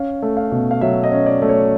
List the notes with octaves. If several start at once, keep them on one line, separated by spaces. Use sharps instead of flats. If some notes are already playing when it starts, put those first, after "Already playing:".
Already playing: C#4 F5
A3
F5
B2
F5
F#3 E5
D#5
C#4
D5
A3
C#5